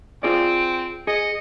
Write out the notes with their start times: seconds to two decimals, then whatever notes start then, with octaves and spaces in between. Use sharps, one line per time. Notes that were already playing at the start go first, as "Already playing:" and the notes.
0.23 C4 F4 G#4 D5 D7
1.07 G#4 D#5 C#7